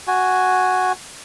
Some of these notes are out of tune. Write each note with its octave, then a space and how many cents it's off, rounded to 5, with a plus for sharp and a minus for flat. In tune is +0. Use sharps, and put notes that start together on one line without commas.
F#4 +0 G#5 +0